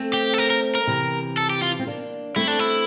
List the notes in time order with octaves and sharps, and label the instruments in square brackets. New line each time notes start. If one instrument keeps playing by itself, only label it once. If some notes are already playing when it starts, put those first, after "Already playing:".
Already playing: [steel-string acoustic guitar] A3 C4
[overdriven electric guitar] G4
A4
A#4
A#4
A#4
[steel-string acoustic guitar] C3 E3
[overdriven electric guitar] A4
G4
F4
[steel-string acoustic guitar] C4
A#3 D4
[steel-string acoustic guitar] A3 C4 [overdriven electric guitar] E4
[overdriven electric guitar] D4
E4